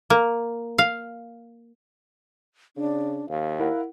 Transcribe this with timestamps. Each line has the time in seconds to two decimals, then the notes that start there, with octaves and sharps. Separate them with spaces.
0.10 A#3
0.78 F5
2.77 C#3 D4
3.29 D#2 F5
3.59 E4 A#4 F#5